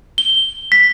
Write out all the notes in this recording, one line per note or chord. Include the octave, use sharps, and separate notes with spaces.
G7
B6